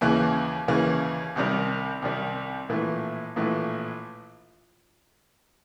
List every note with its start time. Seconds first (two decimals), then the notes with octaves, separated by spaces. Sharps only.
0.01 D#2 C#3 E3
0.68 D#2 C#3 E3
1.36 C2 C3 D#3 G3
2.02 C2 C3 D#3 G3
2.69 A#1 A2 E3 A3
3.36 A#1 A2 E3 A3